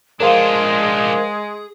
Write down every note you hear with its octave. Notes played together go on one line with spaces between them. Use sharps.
F3 G#3 D4 G#4 A#4 C5 F5